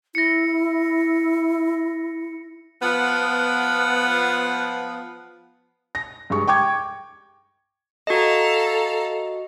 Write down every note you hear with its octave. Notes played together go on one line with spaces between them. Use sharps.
E4 A#6 C#7
F3 B3
A#6
G2 G#3 C#6
G5 C#6 D6 G#6
F#4 A4 D#5 F5 A#5